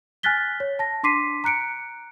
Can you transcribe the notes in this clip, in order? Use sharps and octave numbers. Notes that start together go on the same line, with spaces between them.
G#5 F6 F#6 A6 B6 G7
C#5
A5 A#6
D4 C6 D6 B6 C7 D#7
A#5 F#6 C#7 D7